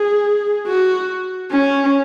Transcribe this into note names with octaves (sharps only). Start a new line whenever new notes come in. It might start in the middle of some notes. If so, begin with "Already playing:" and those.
Already playing: G#4
F#4
C#4